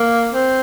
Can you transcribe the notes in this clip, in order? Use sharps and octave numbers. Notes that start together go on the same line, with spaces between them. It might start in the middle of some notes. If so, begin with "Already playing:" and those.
Already playing: A#3
C4